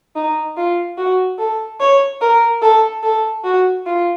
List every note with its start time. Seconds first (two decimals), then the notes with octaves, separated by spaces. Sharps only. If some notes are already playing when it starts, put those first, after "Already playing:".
0.15 D#4
0.57 F4
0.98 F#4
1.39 A4
1.80 C#5
2.21 A#4
2.62 A4
3.03 A4
3.44 F#4
3.86 F4